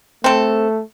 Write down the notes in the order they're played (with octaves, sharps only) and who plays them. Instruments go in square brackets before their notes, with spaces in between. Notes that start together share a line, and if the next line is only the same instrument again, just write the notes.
[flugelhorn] A3 [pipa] C4 A4